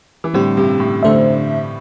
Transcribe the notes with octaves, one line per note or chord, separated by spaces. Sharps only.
E3
A2 D3 G3 C4 G4
G2 C3
A2
D3 A3 D4 C5 E5